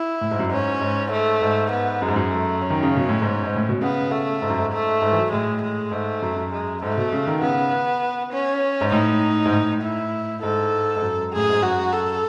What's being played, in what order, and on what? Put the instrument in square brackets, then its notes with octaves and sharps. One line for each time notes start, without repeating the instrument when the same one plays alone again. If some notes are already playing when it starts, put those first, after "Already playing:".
Already playing: [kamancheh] E4
[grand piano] A2
G#2
F#2
[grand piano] G#2 [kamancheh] C#4
[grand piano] G#2
[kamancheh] A3
[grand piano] G#2
[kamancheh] B3
[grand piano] F#2 [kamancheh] G#3
[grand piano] G#2
F#2
[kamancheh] A3
C#4
[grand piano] D#3
C#3
B2
A2
G#2
G#2
A2
B2
[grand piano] C#3 [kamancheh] B3
[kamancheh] A3
[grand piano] G#2
F#2
G#2
[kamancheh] A3
[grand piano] G#2
E3
F#3
[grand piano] A2 [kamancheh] G#3
[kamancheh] G#3
[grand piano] G#2 [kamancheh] A3
[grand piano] F#2
F#2
[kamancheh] G#3
[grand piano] G#2 [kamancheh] A3
[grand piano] B2
C#3
D#3
[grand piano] C#3 [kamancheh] B3
[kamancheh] C#4
[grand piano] G#2
[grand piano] A2 [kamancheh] D#4
[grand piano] G#2
A2
[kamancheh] E4
[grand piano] G#2 [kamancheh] A4
[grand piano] G#2
F#2
[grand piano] A2 [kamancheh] G#4
[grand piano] G#2
[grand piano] F#2 [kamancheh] F#4
[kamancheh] A4